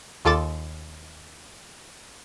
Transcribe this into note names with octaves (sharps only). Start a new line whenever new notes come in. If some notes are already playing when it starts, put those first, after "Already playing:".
D#2 F4 A4 D6 A6